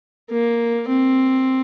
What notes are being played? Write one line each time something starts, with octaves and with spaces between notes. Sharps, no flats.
A#3
C4